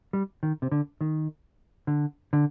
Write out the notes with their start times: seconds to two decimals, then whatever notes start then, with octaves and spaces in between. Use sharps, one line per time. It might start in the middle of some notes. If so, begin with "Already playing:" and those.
0.13 G3
0.43 D#3
0.62 C3
0.71 D3
1.01 D#3
1.87 D3
2.33 D3